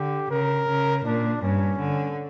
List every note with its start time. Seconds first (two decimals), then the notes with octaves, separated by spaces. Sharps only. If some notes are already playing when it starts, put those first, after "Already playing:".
Already playing: D3 G4
0.30 C#3 A#4
0.68 C#3
1.05 A#2 D4
1.42 G2 C#4
1.80 D3